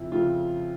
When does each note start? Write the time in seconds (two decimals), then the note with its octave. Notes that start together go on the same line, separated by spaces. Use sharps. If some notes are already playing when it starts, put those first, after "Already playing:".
Already playing: F2 C#3 F3 E4
0.12 F2 C#3 F3 F4